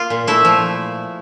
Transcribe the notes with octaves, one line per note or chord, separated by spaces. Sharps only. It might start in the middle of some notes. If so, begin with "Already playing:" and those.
Already playing: A#3 F4
A#2
A3 E4
F3